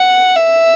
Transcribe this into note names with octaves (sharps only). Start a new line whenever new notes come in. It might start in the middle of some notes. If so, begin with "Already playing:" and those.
Already playing: F#5
E5